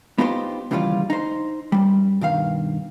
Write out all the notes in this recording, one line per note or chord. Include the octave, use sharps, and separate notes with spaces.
B3 D#4 F4 G4 B4 C5
D#2 C#3 E3 G3 F4
D#4 C5
F#2 G3
B1 G2 D#3 F5